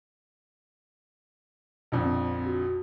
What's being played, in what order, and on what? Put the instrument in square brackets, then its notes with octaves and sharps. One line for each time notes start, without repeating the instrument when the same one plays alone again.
[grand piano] A#1 F2 D3 [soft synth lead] B2
[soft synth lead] C4
F#4